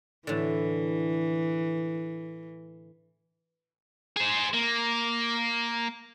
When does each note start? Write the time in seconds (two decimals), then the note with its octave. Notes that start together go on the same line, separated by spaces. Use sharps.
0.27 A2 D3 E3
4.16 G#4 C5
4.54 A#3